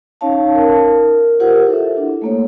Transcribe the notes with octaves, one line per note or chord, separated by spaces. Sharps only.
C#4 D#4 C#5 F5 A5
A#4
F4 G4 A#4 C5 F#5
E4 A4 E5
D4
A3 A#3 C#5